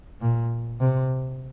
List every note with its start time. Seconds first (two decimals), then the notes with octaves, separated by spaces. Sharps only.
0.21 A#2
0.80 C3